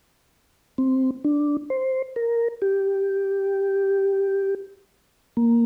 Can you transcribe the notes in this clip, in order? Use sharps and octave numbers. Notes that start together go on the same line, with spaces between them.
C4
D4
C5
A#4
G4
A#3